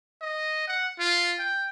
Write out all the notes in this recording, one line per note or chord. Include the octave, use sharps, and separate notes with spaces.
D#5
F#5
F4
G5